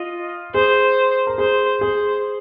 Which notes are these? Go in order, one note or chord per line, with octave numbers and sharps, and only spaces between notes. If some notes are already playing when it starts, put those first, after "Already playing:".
Already playing: F4 D#5
G#4 C5
A#4
G#4 C5
G#4 C5